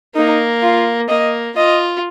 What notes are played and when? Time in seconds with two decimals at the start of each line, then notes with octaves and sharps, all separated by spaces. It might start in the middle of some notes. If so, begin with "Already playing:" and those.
0.16 A#3 D#4
0.63 F4
1.09 A#3 D#5
1.56 F4 D#5